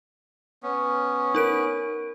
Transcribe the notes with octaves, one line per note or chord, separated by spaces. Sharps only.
B3 C#4
D#4 A#4 D7